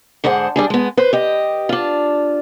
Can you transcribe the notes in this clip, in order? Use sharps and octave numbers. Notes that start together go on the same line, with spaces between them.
G#2 D3 G#4 C5 F#5
G3 D4 G#4
G#3 B3
B4 C5
G4 D#5
D4 F4